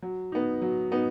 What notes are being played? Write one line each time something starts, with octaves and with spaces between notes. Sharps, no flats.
F#3
B3 D#4
F#3
B3 D#4